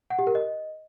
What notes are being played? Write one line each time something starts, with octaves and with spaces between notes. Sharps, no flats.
F#5
G4
A#4
D#5